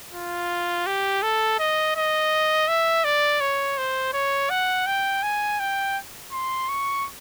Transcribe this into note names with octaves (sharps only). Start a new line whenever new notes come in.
F4
G4
A4
D#5
D#5
E5
D5
C#5
C5
C#5
F#5
G5
G#5
G5
C6
C#6